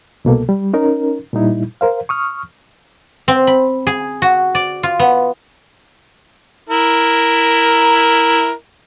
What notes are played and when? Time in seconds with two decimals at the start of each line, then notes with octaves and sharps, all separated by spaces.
0.25 C2 B2 A#3 A4
0.49 G3
0.73 C#4 D#4 A#4
1.33 A#2 G3 D#4 E4
1.81 A#4 C5 F5
2.09 C#6 D#6 F6
3.28 C4
3.47 B5
3.87 G#4
4.22 F#4
4.55 D5
4.83 F4
4.99 B3
6.69 E4 A#4